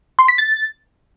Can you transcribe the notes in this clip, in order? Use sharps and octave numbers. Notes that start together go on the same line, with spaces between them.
C6
B6
A6